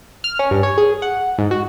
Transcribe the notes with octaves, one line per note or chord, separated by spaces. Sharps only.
F6
C#4
G2
C#5
G#4
F#5
G#2
F#4